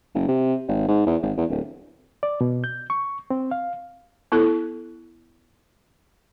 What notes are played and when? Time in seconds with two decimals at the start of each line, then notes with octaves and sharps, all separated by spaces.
0.15 F#1
0.28 C3
0.68 G#1
0.88 G#2
1.07 E2
1.22 G#1
1.38 E2
1.50 D1
2.23 D5
2.41 B2
2.64 G6
2.90 C#6
3.30 C4
3.51 F5
4.32 B3 E4 A4